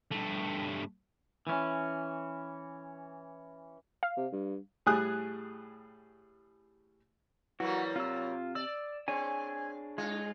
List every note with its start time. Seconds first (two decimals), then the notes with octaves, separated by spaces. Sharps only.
0.11 G2 A3
1.47 E3 C#4
4.03 F5
4.17 C3
4.32 G2
4.86 A2 G3 G#4 G#5 D#6 F#6
7.60 E3 F#3 G3 A#3 F#4
7.96 C3 F4 E6
8.55 D5 E6
9.08 C4 D4 G#4 C#5 G#5
9.98 G#2 G#3 F4